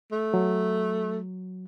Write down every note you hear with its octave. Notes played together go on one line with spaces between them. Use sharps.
A3
F#3